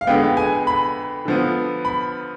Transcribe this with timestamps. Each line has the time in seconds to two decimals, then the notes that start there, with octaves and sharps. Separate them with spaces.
0.01 F5
0.07 F2 D3 G#3 B3 G5
0.37 G#5
0.67 B5
1.25 D3 F3 B3
1.85 B5